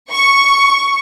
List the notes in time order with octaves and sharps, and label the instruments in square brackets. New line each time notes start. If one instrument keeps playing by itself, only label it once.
[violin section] C#6